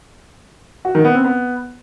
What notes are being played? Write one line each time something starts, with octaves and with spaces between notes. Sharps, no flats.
F#4
D#3
B3
C4
B3